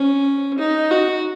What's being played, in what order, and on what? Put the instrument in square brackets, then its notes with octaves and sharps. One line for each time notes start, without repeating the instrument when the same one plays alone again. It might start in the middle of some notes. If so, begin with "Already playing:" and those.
Already playing: [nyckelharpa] C#4
D#4
F#4